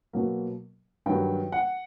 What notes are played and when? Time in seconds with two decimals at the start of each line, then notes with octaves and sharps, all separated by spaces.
0.13 B2 F#3 A#3
1.06 G2 D#3 F#3 G5
1.52 F#5